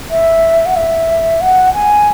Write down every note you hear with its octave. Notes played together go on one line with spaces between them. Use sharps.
E5
F#5
E5
F#5
G#5